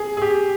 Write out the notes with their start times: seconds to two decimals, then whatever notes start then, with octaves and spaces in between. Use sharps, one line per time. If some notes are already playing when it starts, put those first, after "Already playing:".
Already playing: G#4
0.17 G#4
0.22 G4